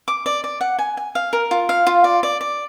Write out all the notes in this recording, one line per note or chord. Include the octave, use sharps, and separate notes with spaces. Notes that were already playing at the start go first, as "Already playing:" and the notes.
D6
D5
D5
F#5
G#5
G#5
F5
A#4
F4
F5
F4
D5
D5
D5